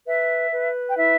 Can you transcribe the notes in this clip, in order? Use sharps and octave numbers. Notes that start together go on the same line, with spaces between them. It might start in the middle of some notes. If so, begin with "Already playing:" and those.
B4 E5
B4
G5
E4 E5